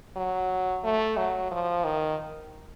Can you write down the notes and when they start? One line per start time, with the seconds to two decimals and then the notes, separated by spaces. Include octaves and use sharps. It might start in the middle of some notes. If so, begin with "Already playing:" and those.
0.16 F#3
0.84 A3
1.17 F#3
1.51 F3
1.84 D#3